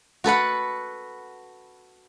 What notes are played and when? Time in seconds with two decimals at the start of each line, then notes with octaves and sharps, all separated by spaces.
0.24 F#4 A4 B4 F#5